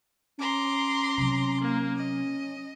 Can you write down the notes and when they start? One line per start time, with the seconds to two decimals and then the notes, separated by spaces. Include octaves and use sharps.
0.38 C#4 A#5 C6 D6
1.17 C3 F#3
1.60 A#3
1.95 D#5